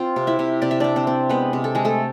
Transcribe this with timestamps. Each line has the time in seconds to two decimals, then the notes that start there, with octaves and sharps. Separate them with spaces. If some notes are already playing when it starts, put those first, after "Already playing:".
Already playing: C4 F4 F5
0.16 C3
0.27 E4 E5
0.39 C3
0.62 C3 D5
0.71 E5
0.80 C3 D4 D5
0.96 C4 C5
1.07 C4
1.29 G#3 B3 B4
1.53 C3
1.64 A4
1.75 G#3 G#4
1.85 A3 A4